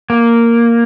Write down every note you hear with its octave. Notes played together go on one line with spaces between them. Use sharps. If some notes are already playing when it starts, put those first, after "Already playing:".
A#3